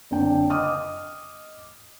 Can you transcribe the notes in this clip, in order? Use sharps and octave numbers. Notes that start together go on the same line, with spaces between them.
F#1 D3 C4 D4 G5
D#5 D6 D#6 F6